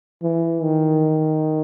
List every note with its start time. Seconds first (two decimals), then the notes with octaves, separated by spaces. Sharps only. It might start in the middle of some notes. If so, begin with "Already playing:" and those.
0.23 E3
0.63 D#3